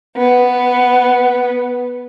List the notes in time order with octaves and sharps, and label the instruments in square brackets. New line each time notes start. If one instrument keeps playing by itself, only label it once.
[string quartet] B3